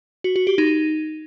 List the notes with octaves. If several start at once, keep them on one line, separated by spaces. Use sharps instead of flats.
F#4
F#4
G4
D#4